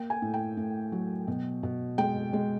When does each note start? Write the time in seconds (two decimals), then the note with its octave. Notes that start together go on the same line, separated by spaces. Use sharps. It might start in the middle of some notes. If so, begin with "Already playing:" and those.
Already playing: A#3 G5
0.10 G#5
0.22 A2
0.34 G5
0.57 A2
0.92 F#3
1.28 B2
1.63 B2
1.98 G#3 G5
2.33 G#3